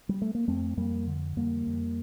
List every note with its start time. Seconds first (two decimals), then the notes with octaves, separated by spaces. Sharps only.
0.09 G3
0.22 A3
0.35 A#3
0.48 F2 A3 C4
0.77 F2 G3 A#3
1.07 D3
1.37 F2 G3 A#3
1.67 F2